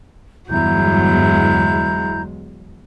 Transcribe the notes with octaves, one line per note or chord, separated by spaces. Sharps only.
G1 E2 G2 F#3 G#3 E4 A#5 G6